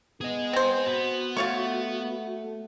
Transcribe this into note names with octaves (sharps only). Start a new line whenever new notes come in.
B3 G#4 D#5
C4 C5
B3 F#4
A3 F4 C#5 C#6